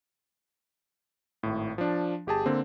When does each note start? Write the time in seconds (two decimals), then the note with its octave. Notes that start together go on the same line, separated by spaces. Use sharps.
1.43 G#1 A2
1.78 F3 D4
2.27 G1 G4 G#4 A5
2.46 D3 A#3 C4